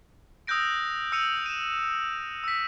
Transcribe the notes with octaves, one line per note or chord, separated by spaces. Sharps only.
D#6 E6 F#6 G6 A#6 D7
E6 C#7 D#7 F7
D#7 E7
E6 B6